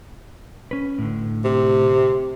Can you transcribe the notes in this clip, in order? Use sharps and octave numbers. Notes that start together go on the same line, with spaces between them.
C#4 B4
A2 D3
C3